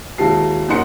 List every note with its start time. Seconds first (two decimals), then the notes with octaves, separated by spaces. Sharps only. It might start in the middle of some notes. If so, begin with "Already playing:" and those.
0.18 D#2 G#3 E4 F#4 A5 C7
0.69 F#2 A#3 D#4 F#5 C6 C#7